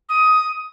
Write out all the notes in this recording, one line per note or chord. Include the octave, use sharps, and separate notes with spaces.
D#6